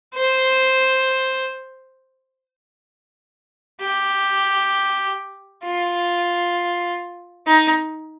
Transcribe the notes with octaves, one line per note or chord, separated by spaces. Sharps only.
C5
G4
F4
D#4